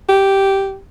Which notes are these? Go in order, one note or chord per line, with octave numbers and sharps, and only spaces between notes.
G4